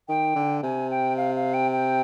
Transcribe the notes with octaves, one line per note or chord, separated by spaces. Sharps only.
D#3 G5
D3
C3 G#5
G5
F5
F5
G5
G5